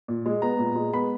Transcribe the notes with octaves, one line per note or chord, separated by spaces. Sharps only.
A#2
G#3
B3 A#5
A#2
G#3
B3 B5